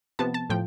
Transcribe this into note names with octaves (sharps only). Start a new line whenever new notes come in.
C3 F3 B3 A5
A5
A2 F3 G5